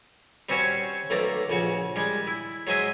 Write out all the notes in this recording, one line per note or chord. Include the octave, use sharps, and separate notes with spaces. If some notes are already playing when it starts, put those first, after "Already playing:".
G3 C4 C#4 F#4 C5 C#5
B1 A3 A#3 D5 A#5
A#1 C#3 F#4
G3 G#3 D4
E4
F#3 G#3 C5 D#5 E5